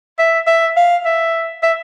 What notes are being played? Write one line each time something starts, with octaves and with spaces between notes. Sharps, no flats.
E5
E5
F5
E5
E5